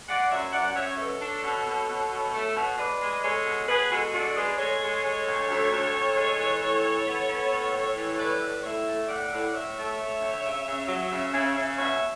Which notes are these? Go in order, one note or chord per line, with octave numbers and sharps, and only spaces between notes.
G#3 D5 F#5
F#2 C#5 E5
F#2 D5 F#5
F#2 C#5 E5
B2 A4 C#5
D4
B2
B2
B2
B2
A3
B2
G#3 B4 D5
G#3
G#3 A4 C#5
B2
B2 G#4 B4
G#3 F#4 A4
D4 F#4 A4
G#3 G#4 B4
G#3 A4 C#5
G#3
G#3
D2
D2
D2
D2
G#3
E3
A2
E3
B3
B3
A2
A2
E3
A2 B4 D5
A2
A2 C#5 E5
A3
A2 D5 F#5
A2
A2 C#5 E5
A3
A3
D2
C#3
C#3
F#3
C#3
C#3
C#3
B2 C#5 E5